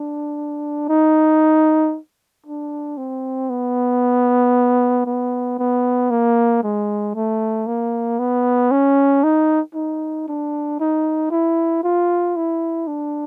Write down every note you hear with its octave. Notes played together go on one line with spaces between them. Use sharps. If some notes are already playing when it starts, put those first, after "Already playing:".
Already playing: D4
D#4
D4
C4
B3
B3
B3
A#3
G#3
A3
A#3
B3
C#4
D#4
D#4
D4
D#4
E4
F4
E4
D4